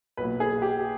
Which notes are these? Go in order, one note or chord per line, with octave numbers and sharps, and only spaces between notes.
B1 A#2 B4
G#4
G4